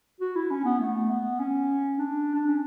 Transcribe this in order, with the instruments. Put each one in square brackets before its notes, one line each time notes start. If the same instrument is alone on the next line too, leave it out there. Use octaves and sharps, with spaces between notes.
[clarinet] F#4
E4
C#4
B3
A3
B3
C#4
D4
D4
C#4